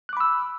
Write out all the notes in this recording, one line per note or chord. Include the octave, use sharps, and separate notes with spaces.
B5 D6 E6 F#6